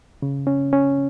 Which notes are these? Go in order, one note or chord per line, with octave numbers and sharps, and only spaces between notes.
C#3
C#4
C#4